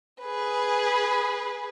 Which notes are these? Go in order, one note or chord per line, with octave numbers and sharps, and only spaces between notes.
G#4 B4